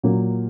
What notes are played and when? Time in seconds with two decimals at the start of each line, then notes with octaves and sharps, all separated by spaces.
0.04 A#2 F#3 A#3